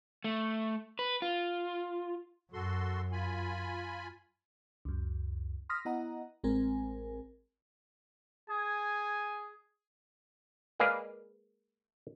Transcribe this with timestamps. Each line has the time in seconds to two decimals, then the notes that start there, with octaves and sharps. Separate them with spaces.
0.24 A3
0.99 B4
1.22 F4
2.53 F#2 F#4 A4 C6
3.12 F4 G#5 B5
4.85 C#2 F#2
5.69 C6 D#6 F6 A#6 B6
5.85 B3 E4 D#5 F#5 A#5
6.44 A1 G#3 C4 A#4 G#5
8.50 G#4 G#5
10.80 G#3 A#3 G#4 B4 D5 F5